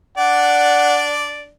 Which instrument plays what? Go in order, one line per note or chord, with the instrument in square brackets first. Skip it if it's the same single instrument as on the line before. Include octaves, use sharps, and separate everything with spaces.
[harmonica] D4 D5 [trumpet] F#5